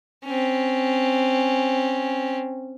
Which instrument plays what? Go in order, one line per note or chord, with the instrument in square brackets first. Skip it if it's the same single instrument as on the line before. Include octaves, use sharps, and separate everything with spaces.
[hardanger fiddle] C4 C#4